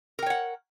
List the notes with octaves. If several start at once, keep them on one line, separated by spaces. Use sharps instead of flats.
A#4 C#5 F#5 G5